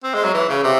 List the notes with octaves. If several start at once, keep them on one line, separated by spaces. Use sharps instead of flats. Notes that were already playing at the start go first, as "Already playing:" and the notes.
C4
G#3
F#3
E3
C#3
C3